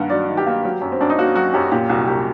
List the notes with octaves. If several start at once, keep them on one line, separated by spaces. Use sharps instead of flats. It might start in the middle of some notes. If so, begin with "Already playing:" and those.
Already playing: G2 D#3 A#3 F#5
F#3 D5
D#3
G4
A#3
F#3
F#2
C4
F#2 D4
D#4
A#3 F#4
F#3 F#4
F#2 G4
A#2 G4
C2 F#4
C2 G4